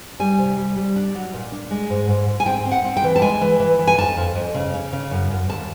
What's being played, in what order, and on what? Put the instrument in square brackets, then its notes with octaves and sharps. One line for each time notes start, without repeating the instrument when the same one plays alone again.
[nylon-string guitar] G3 G#5
C3
G3
G3
D4
F#3
A#2
D4
G#3
G#2
G#2
G#2
G#5
C4 G5
C4
F#5
C4
G5
E3
A5
G#3 G#5
E3
E3
E3
G#5
F2 A5
F2
F2
C#3
C#3
C#3
F#2
F#2
D#2 A5